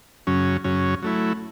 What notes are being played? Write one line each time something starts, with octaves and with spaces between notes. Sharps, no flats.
F#2 C#3 F#3 C#4
F#2 C#3 F#3 C#4
F#3 A3 E4